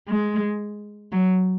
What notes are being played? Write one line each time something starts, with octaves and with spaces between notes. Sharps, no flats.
G#3
F#3